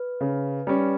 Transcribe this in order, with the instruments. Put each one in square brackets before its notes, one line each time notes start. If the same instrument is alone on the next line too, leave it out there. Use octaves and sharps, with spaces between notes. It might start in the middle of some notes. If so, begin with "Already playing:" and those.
Already playing: [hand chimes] B4
[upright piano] C#3
G3 C#4